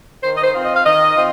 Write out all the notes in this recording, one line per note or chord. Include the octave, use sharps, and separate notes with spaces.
D#3 C5
D#5
C5
C4 F4
D#5
F5
D#3 D#5
C4 F4